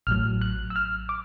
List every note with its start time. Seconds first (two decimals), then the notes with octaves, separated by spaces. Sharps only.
0.07 A1 A2 F#3 F6
0.41 F#6
0.70 E6
0.76 F6
1.09 D6